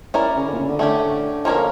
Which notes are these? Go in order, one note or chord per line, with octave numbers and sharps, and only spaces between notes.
C#4 E4 A#4 D5
C#3
D3
A#2
C#3
D3
D3 A3 C#4 G4
F3 A#3 C#4 F4 A#4